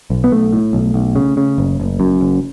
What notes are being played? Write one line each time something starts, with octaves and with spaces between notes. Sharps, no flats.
B1
B3
B1 A3
A2
B1
B1
C#3
C#3
F#1
F#1
F#2
F#1